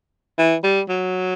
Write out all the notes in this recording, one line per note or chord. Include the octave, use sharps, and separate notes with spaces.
E3
G3
F#3